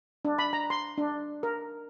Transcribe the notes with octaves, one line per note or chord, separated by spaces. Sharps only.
D4
B5
A#5
C6
D4
A#4